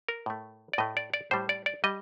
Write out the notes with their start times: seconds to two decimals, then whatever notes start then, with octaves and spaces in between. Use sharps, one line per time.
0.09 A#4
0.26 A2 A3
0.73 D5
0.78 A2 A3 D#5
0.97 D5
1.14 D5
1.31 A2 G3 C5
1.49 D5
1.66 D5
1.84 G3 D#5